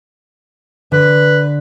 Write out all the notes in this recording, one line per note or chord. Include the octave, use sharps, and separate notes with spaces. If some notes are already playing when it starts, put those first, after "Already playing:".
D3 B4